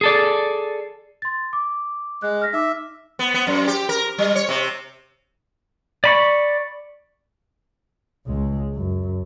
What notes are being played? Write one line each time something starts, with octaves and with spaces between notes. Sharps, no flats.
G#4 A4 D5
C6 A6
D6
G#3 F#6
F6 A#6 B6
D#4 E5 D6
B3
B3
F#2
G4
A#4
G3
C#5
C3
D5 B5 C#6
C#2 G#3
F#2